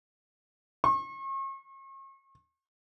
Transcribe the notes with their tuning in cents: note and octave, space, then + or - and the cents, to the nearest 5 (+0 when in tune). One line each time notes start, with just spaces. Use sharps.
C#6 -40